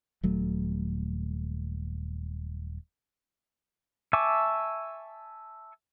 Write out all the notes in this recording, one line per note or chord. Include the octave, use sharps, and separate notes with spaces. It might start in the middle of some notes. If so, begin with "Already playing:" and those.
D#1 F#3 A3
E5 G#5 A5 C#6 D6